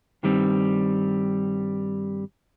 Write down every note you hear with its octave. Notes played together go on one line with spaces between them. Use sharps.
G2 D#3 G3 C4